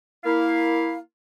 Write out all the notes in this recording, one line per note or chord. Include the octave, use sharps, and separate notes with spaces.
A#3 E4 F5